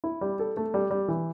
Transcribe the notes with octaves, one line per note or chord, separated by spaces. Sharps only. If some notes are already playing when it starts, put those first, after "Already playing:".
E4
G3
A4
A3
G3
G3
E3